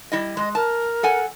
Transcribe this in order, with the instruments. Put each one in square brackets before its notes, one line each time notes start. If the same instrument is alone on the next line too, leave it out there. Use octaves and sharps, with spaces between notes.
[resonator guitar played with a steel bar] G3 E4 D#5
[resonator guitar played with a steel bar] G#3 [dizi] D#5
[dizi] A#4 [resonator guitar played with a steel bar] A5
[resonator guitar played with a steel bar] A4 F#5 G#5